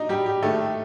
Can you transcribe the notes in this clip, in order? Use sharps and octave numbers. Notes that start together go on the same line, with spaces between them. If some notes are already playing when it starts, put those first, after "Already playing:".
Already playing: D4 D#4 D#5
G3 G4
G4
D#3 A3 A4